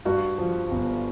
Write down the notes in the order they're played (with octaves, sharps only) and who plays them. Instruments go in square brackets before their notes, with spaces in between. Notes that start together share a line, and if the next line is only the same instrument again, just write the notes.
[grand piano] G2 F#4
F3
G1